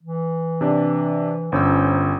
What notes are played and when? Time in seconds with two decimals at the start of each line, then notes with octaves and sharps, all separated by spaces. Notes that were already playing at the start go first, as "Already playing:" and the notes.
0.03 E3
0.61 C3 D4 D5
1.52 G1 C#4 C5 E6